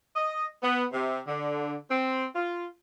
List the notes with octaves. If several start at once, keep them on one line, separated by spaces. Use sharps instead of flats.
D#5
B3
C3
D3
C4
F4